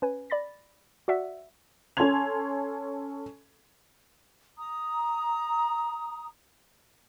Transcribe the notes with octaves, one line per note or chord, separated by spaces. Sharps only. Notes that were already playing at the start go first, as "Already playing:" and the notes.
C#4 B4 G#5
D5 B5 A6 A#6
F#4 D5 E5 F#5
C#4 A4 G#5 C6 G#6 F7
A#5 D#6